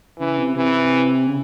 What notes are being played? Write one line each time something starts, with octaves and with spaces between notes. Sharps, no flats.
C#3 E3
C3
C3 E3
C#3